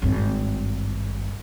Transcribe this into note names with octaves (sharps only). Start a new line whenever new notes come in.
G#1 G2